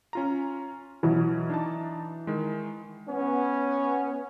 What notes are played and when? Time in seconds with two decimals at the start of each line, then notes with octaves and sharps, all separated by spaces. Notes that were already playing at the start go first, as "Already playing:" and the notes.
0.13 C#4 F4 A#5
1.03 B2 E3 F#3
1.50 D4 D#4 A5
2.27 D#3 G#3
3.09 B3 C#4